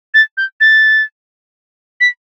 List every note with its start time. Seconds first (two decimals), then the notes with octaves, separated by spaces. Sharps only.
0.14 A6
0.37 G6
0.60 A6
2.00 B6